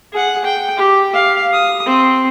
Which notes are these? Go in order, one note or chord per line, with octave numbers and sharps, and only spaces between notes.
G#4 F#5
G5
G4
F5
D#6
C4